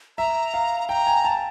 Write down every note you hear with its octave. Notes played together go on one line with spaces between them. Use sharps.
E5 A#5
F5
G5 A#5
G#5
A5